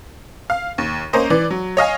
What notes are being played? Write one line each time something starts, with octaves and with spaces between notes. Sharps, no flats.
F5
D#2
A#3 C#4 C5 D#5
E3 D5
F#3
C#5 D#5 F5 G#5